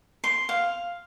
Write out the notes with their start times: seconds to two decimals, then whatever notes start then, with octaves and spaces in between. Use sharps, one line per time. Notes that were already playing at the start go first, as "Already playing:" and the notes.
0.24 C6
0.49 F5